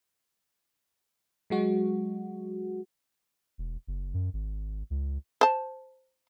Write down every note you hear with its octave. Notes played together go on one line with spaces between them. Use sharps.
F#3 G#3 F#4
E1
F#1
F#2
G#1
C#2
C5 A5